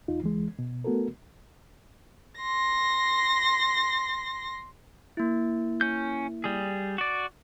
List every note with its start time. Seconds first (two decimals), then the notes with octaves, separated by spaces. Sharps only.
0.08 E2 D#4 F4
0.21 C#2 E3 G#3
0.59 B2
0.84 A3 B3 F#4 A4 A#4
2.41 C6 A#6
5.17 A#3 E4
5.81 C#4 G6
6.44 G3 G#4
6.98 F#4 D5